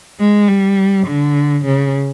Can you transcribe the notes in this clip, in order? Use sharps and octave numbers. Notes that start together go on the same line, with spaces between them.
G#3
G3
D3
C#3